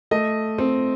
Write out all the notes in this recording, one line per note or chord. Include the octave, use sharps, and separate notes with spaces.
A3 D#5
C4